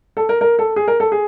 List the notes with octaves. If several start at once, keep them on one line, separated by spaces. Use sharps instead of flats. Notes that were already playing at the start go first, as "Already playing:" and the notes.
A4
A#4
A#4
A4
G#4
A#4
A4
G#4